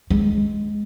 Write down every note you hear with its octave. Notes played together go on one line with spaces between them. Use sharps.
G#3